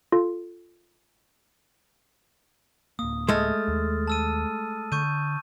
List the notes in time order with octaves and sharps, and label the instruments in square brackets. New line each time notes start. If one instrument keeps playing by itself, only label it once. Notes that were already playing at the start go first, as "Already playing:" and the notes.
[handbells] F4 A4
[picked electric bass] D1 A#3 [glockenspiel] D#6
[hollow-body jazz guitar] G#3 A3 [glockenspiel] D#6 F6 A6
[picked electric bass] D#2
[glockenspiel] A5 E6 D#7
[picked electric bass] D3 [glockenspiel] C#6 G6 D#7